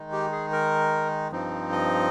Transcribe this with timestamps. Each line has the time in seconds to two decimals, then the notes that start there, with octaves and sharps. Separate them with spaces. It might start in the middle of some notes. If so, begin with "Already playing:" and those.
Already playing: D#3 G#3 D#4
0.12 G4
0.32 G#4
0.52 A#4
1.31 G2 F3 C4 D#4
1.72 D#5